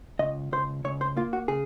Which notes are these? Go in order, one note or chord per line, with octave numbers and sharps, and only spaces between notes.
C#2 D#5
C#2 C5
C#2 C#5
C5
A#3 F4
F#4
C#3 G#4